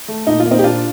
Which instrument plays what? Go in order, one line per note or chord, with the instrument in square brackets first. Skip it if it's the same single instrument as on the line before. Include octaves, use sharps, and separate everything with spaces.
[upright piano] A3
A#2 D#4
F4
A#3
C4 D#4
G4
A#2 D4 F4